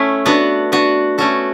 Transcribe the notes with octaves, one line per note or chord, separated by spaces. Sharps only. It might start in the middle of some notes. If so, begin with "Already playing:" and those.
Already playing: A3 C#4 E4
B3 D4 F#4
B3 D4 F#4
A3 C#4 F#4 A4